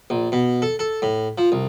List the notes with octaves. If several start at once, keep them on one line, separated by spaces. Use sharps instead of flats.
A#1
B2
A4
A4
A2
F3
C2